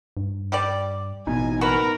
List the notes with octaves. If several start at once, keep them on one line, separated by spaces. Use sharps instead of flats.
G2
G3 G4 D5
A1 E2 B2 D#4 G#5
F#4 A#4 B4